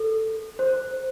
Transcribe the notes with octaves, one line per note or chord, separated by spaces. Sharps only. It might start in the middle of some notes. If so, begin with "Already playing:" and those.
Already playing: A4
C5